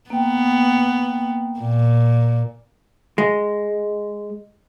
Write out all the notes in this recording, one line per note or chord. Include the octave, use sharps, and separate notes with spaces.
A#3 B3 G5
A#2
G#3